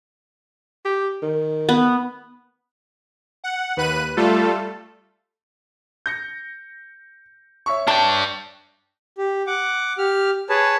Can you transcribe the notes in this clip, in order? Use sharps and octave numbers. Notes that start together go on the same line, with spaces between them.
G4
D#3
B3
F#5
D#2 B4 F#6 D#7
G3 A3 F4 A4
G6 A#6 C#7
C#5 E5 C#6
D4 G5 A5
G4
F#5 D6
G4 F6
G#4 B4 C#5 A5